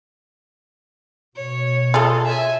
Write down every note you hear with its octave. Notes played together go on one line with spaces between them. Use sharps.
B2 C#5
F4 G#4 A4
E5 G#5